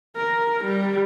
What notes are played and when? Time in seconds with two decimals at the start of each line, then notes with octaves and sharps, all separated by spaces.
0.17 A#4
0.65 G3